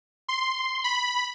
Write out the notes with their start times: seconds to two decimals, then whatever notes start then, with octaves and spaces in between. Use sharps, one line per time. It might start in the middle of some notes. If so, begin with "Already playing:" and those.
0.29 C6
0.84 B5